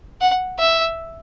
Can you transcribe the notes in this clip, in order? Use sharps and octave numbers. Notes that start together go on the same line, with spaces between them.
F#5
E5